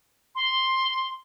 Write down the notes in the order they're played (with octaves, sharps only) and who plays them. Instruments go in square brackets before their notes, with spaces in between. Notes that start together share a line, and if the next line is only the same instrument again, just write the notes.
[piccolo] C6